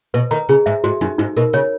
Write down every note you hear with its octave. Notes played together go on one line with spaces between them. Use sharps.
B2 B4
D#3 A#5
C#3 G#4
G#2 E5
G#2 F#4
F#2 D#4
G#2 D#4
B2 A#4
C#3 C#5